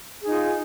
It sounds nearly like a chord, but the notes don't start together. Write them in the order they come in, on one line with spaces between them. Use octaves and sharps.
G#4 D#4 F4